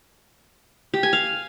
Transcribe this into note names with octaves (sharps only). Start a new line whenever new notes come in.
G4
G#5
F5